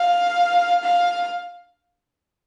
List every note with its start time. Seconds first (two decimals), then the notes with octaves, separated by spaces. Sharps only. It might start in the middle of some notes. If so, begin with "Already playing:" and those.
Already playing: F5
0.83 F5